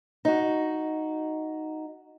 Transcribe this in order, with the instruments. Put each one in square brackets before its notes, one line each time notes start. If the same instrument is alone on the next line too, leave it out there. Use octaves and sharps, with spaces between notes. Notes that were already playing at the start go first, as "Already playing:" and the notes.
[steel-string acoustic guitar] D#4 F#4